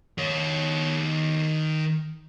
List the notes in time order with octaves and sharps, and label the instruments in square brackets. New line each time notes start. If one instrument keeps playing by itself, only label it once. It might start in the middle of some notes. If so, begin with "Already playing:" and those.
[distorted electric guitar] D#3 C#5